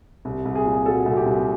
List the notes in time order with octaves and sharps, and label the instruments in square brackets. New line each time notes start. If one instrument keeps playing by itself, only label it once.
[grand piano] C2
C2
G#4
A#2
F#3 A4
C2
G4
C2